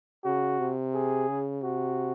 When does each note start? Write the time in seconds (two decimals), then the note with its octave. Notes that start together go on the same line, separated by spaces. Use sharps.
0.25 C#3 F#4
0.59 C3
0.94 G#4
1.29 C#3
1.63 C3 F#4